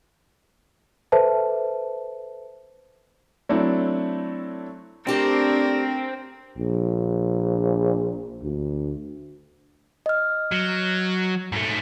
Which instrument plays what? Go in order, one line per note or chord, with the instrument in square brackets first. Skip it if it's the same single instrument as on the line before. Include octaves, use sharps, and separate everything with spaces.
[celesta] A4 B4 C5 E5 A5
[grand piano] F#3 A3 C4 D4 E4
[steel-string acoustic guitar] A3 G4 D5 [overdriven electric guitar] C4 [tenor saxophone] D4 [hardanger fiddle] A#4
[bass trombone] A#1
D2
[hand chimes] D#5 F6
[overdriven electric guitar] F#3
G#2 A3